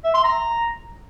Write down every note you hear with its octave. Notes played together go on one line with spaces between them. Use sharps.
E5
C6
A#5